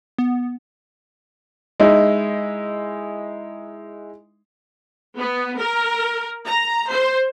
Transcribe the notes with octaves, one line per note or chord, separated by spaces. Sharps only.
B3
G#3 D#4 E4
B3
A#4
A#5
C5